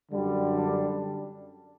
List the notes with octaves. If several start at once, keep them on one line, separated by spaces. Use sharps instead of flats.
F#2 D3 G3
D4